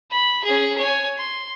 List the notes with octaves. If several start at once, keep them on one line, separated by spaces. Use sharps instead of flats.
B5
C#4 G#4
C#5 G#5
C6